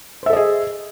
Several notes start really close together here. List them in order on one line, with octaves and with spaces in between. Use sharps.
C5 E5 A4 D#5 G#4